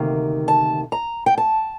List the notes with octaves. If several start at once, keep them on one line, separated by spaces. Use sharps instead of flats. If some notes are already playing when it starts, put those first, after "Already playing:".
Already playing: D2 C3 D#3 A#3
A5
A#5
G5
A5